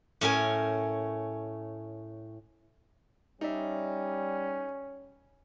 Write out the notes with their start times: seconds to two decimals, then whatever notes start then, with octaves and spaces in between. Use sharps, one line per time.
0.21 A2 C#4 A#4 G#5
3.41 G3 C#4 D#4 D5 E5